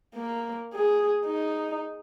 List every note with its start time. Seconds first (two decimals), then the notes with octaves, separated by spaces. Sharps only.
0.14 A#3
0.73 G#4
1.25 D#4